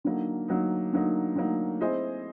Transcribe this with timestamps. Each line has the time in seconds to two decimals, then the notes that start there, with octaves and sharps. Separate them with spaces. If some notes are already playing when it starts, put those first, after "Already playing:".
0.04 D3 F#3 A#3 D#4
0.48 D3 F#3 A#3 D#4
0.93 D3 F#3 A#3 D#4
1.36 D3 F#3 A#3 D#4
1.81 C4 E4 G#4 C5 D#5